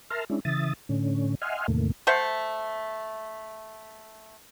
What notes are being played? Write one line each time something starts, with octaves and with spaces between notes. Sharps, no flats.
A#4 E5 A5 A#5 C6 F6
G#3 C#4 D4 E4
C#3 E3 E5 D#6 A6
A2 D3 C#4
D#5 E5 F#5 G#5 C6 F6
E2 A2 C3 D#3 A3 A#3
A3 C5 E5 F#5